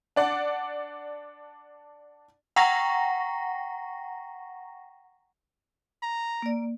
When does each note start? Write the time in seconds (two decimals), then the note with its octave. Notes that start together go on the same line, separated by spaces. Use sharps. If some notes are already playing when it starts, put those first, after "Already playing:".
0.16 D4 D5 F#5
2.56 F#5 G5 A#5 C#6 A#6
6.03 A#5
6.42 A#3 D5